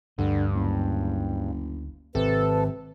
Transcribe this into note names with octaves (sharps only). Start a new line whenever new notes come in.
D2 G2 D3
F#1
G#1 C3 A4 B4